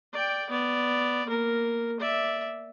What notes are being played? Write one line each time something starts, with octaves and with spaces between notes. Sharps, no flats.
D5 G5
B3 D5
A#3 A#4
D5 E5